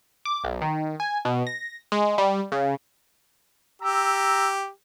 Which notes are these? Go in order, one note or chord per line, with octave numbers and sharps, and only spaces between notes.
D6
B1
D#3
G#5
B2
A#6
G#3
G3
C#3
G4 A#5 E6